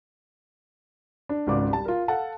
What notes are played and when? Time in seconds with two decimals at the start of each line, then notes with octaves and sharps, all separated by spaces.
1.29 D4
1.47 G#1 C#2 C#3 D5 D6
1.71 G3 A5
1.85 F4 A#4
2.08 A4 F5 F#5 A5